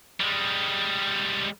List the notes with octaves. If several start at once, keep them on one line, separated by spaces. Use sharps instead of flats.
G3 G#3